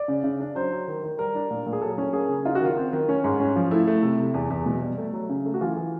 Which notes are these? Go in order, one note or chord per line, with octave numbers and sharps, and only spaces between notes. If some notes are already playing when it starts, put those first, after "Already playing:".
Already playing: D5
C#3
C#3
D4
F#3 C5
F#3
D#3
D#3
G3 A#4
D4
A#2
A#2
G#4
F#3 A4
C#4
A#3 G#4
C#3
D#4 F4
F#4
D#3 F4
C4
D#3
C#4
G#2
C#4
F3
A3 E4
A3
C3
C3
E2
E2
B2
G3
A3
F#3
C#3
A3
F#4
E3 F4
E3